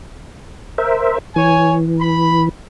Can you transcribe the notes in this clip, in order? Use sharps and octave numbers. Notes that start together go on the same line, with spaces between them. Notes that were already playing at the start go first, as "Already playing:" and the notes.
A#4 C5 E5
E3 C#5 G#5
B5